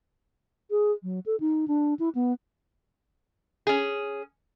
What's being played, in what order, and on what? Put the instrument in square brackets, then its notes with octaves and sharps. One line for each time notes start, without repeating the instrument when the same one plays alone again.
[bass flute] G#4
F#3
A4
D#4
D4
E4
B3
[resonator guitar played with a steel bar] C#4 G#4